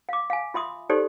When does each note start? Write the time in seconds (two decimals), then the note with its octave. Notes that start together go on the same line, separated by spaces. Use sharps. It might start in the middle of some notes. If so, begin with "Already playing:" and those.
0.09 F5 D6
0.30 F5 G#5
0.54 F4 E5 C6 D#6
0.90 D#4 G4 A4 C5 D5 C6